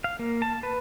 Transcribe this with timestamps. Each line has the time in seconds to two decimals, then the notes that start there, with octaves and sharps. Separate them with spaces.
0.04 F5
0.19 A#3
0.42 A5
0.63 B4